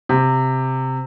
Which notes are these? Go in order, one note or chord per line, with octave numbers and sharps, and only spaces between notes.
C3